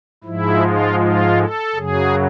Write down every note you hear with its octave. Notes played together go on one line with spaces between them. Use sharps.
G#2 F3 G#3 E4
F4
F4
A4
F#2 C#3 F#3 G#4